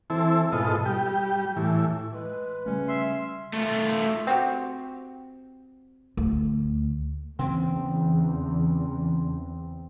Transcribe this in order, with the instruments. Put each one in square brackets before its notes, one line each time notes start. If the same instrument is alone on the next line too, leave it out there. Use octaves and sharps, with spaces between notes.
[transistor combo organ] E3 C4 E4 A4
G#2 B2 F4 A4 D#5
G3 G4
A2 E3
[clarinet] G#3 [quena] B4
[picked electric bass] C#3 G3 A3 [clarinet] C#4
[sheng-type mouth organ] E5 C6
[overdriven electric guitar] A3 F4
[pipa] C4 F#4 G4
[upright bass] D2
[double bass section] E2 [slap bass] C#3 E3 A#3 [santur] C4